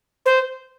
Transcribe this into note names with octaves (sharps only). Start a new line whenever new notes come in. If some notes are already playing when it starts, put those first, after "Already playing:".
C5